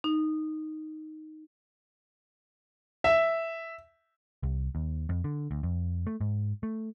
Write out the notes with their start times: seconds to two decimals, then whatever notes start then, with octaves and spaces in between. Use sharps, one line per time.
0.04 D#4
3.04 E5
4.43 C2
4.75 D#2
5.09 F2
5.24 D3
5.51 D2
5.63 F2
6.07 A3
6.21 G#2
6.63 A3